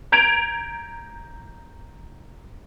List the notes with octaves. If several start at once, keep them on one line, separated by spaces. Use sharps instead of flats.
A#5 G6 G#6 D7 F7